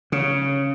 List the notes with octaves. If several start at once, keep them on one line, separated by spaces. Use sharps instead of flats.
C#3